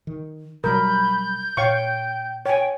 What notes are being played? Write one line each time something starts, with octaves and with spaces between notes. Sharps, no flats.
D#3
B2 F#3 G3 A#4 B5 G6
A#2 C#5 F5 G5 C#6
C#5 G5 G#5